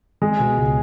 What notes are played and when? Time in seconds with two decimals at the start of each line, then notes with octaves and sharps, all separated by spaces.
0.22 G#3 G#4
0.40 B2
0.57 C#2